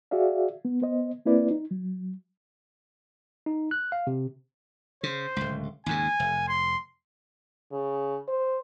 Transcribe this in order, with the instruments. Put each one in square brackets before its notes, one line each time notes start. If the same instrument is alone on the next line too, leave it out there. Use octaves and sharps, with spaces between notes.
[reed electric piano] F#4 G#4 D5 E5 F5
B3
B3 C5 D#5
A#3 C4 E4 B4 D5
D#4
F#3
[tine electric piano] D#4
F#6
F5
C3
[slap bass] C#3 [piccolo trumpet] C5
[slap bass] D1 C#2
[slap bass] D#2 G#2 C#3 [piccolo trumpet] G#5
[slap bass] F1
[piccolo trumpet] C6
[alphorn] C#3
C5